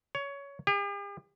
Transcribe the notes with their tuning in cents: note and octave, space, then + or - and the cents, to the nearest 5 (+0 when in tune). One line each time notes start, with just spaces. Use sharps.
C#5 +15
G4 +45